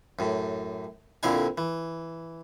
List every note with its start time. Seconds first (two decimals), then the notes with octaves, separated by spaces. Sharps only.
0.19 F#2 A2
1.23 A#1 F2 D3 E4 F5 G#5
1.58 E3